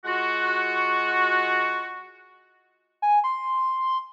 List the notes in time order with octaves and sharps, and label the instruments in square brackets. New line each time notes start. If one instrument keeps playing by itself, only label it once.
[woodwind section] G#3 F4 F#4
[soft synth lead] G#5
C6